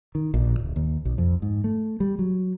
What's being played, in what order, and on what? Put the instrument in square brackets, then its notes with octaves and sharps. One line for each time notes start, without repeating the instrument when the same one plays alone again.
[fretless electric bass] D#3
A#1
D1
D#2
B1
F2
G#2
A3
G3
F#3